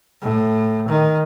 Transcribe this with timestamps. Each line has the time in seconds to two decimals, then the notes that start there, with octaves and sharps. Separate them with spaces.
0.22 A2
0.88 D#3